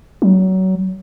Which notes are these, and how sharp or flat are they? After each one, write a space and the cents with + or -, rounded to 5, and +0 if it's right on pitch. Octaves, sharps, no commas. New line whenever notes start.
F#3 +25